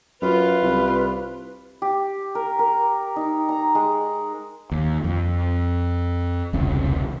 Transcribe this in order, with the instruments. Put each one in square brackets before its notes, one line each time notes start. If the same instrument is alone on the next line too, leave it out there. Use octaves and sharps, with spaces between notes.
[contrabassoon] F#2 [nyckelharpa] F4 [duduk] B4
[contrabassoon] C2
[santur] G4
A#4
A#4
D#4
A#5
G#3
[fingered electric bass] D#2
F2
E1 C2 C#3